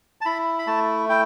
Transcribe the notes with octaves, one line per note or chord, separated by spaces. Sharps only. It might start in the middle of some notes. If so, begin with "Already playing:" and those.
A5
E4 B5
B5
A3 A5
E4 G5